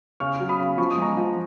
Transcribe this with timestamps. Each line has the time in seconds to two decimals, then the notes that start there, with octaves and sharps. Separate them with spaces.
0.20 C#3 C#6 F6
0.40 F#3
0.49 B5 D#6
0.59 C#3
0.78 F3 C#6
0.91 D#6
0.98 G#3 A#5 C#6
1.17 F3